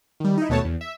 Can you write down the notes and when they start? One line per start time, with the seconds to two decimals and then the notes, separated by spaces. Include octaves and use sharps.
0.20 D#3 G3
0.37 D#4 E4
0.49 D#2 B2 A3 B3 C#5 A5
0.64 E2
0.81 E5